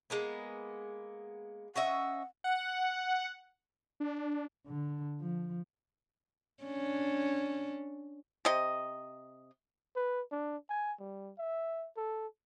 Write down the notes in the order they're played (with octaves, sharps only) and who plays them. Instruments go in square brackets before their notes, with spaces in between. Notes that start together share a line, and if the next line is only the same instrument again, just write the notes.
[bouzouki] G#3 A#3 B3
[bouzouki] C#4 D#5 E5 [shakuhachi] F#5
[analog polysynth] F#5
[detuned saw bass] D4
[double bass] D3
F3
[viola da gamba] C#4 D4
[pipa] C3 D#5
[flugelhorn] B4
D4
G#5
G3
E5
A4